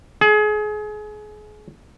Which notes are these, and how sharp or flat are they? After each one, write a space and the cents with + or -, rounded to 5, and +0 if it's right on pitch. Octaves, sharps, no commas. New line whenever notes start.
G#4 +30